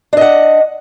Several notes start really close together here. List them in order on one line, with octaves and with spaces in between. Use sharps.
D4 D#5 F#5